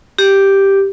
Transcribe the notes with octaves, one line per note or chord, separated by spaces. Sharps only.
G4